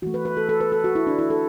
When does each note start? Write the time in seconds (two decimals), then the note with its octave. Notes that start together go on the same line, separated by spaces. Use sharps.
0.02 E3 A3 F#4
0.14 B4
0.25 B4
0.37 A4
0.49 A4
0.61 B4
0.72 A4
0.84 F#4
0.95 E4
1.07 D4
1.19 E4
1.30 A4